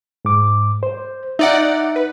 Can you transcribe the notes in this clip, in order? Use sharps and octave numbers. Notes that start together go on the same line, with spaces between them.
G#2 D6
C5
D#4 D5 E5 F#5
B4